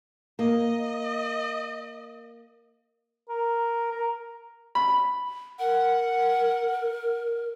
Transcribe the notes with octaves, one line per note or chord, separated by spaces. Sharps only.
A#3 D#5
A#4
A#4
B5
A#4 F#5